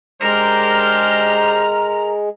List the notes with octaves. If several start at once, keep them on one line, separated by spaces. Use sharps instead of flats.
G#3 D4 G4 A#4 C5 A#5 F6